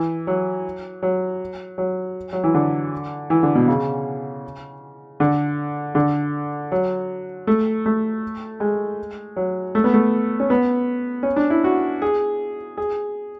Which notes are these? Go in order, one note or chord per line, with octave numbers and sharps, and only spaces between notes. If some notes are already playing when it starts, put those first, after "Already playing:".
Already playing: E3
F#3
F#3
F#3
F#3
E3
D3
E3
D3
B2
C#3
D3
D3
F#3
A3
A3
G#3
F#3
A3
B3
A3
C#4
B3
C#4
D4
E4
F#4
G#4
G#4